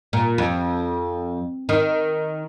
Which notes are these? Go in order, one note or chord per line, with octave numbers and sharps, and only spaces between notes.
A#2
F2
D#3